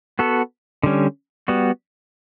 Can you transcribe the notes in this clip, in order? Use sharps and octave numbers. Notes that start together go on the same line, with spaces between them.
B3 F#4 A4
D3 G3 C#4
G3 B3 F#4